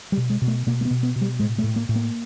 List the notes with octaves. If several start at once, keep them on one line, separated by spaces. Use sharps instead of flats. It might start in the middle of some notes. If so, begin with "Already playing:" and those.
G3
B2
G#3
B2
A3
B2 A#3
A#3
B3
B2
B3
B2
G3
A2 G#3
A3
A2
A#3
A2
A#3